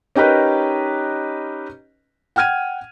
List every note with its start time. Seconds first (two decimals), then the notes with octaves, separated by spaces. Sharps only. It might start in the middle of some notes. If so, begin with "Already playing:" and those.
0.16 C#4 D#4 G4 A#4 B4 D#5
2.36 F#5 G5 F6 G#6 D#7